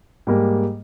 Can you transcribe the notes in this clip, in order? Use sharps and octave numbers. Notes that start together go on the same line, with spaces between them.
G#2 G3 A#3